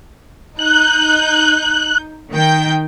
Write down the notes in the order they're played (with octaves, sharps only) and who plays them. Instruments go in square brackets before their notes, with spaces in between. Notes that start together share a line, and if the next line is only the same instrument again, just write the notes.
[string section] D#4 G6 [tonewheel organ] F#6
[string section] D#3 G5 G6